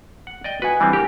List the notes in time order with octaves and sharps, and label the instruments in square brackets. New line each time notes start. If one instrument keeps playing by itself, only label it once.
[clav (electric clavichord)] F#5
D5 D#5 G5
[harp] F#4 D#5 G#5 [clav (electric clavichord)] B4
[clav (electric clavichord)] E3 G3 C4 [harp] D4
[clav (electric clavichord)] G4 A#4